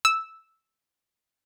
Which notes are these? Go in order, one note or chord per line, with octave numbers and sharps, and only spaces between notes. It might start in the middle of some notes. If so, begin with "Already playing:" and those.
E6